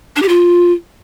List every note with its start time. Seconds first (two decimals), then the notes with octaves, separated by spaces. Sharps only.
0.16 D4
0.22 G4
0.29 F4